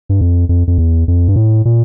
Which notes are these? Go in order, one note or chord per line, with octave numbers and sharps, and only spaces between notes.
G2
F2
F2
F2
E2
F2
G2
A2
A#2